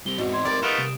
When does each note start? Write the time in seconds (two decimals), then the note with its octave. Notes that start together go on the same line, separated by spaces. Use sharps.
0.06 G3 C4 G7
0.18 E2 G#2 C4 D#4 F#4
0.34 C6 G#6
0.45 G3 A#4 D5
0.62 A3 B3 D#4 F4 D#6 D7 E7
0.78 C2